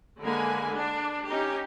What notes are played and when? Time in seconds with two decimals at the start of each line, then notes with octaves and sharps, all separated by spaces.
0.20 D3 G#3 A#3 B4 G#5
0.73 D4
1.27 C#4 D#4 G4